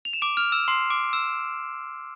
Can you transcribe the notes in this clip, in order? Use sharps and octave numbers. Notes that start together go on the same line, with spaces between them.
F7
E7
D6 D7
F6 F7
E6 E7
C6 C7
D6 D7
E6 E7